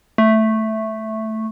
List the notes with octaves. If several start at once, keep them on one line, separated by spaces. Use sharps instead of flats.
A3